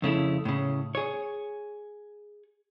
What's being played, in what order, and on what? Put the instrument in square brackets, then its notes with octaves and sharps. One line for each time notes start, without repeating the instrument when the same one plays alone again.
[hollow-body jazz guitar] F2 C#3 A3 E4
A2 C#3
G#4 C#5